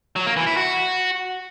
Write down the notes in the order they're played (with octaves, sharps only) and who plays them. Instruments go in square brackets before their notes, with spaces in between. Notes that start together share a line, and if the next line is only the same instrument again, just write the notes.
[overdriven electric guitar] F#3
A#3
E3
E4
F#4